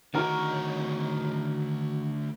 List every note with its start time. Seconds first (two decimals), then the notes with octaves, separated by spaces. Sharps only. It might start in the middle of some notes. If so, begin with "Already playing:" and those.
0.14 D2 D#3 F#4 A#4 C#5